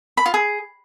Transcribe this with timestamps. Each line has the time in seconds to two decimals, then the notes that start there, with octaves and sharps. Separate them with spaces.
0.17 B5
0.26 F4
0.34 G#4